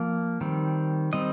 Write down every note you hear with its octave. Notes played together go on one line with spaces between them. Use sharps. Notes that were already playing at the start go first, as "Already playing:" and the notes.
Already playing: F3 A#3
D#3 G3 C4
D#3 G3 C4 D#5